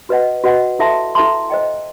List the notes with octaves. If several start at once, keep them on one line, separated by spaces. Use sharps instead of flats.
F#4 B4 D#5 F#5
F#4 B4 D#5 F#5
E4 A4 E5 A5 C6
E4 A4 E5 A5 C6
C5 D#5 G5